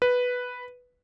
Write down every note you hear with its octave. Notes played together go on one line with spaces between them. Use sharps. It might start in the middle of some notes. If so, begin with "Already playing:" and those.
B4